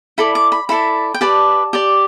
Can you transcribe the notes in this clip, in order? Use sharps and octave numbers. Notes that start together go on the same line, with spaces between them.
E4 A4 D5 B5
D6
B5
E4 A4 D5 B5
G5
G4 B4 D5 A5
G4 D5